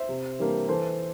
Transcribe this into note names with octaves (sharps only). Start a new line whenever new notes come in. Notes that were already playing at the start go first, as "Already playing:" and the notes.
Already playing: C5 E5
C3
E3 G3 A#3 D4
E3 A4 C5